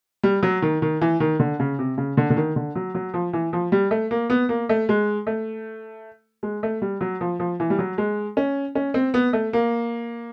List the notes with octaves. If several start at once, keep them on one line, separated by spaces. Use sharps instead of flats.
G3
F#3
D#3
D#3
E3
D#3
D3
C#3
C3
C#3
D3
D3
D#3
D3
F#3
F#3
F3
E3
F3
G3
A3
A#3
B3
A#3
A3
G#3
A3
G#3
A3
G3
F#3
F3
F3
E3
G3
F#3
G#3
C#4
C#4
C4
B3
A3
A#3